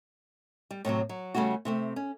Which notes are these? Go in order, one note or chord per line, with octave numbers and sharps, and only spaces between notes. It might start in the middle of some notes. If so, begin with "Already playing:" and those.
G3
A2 C3 E3 F#3
F#3
C#3 G3 A3 C#4 F#4
C3 A3 C4
C#4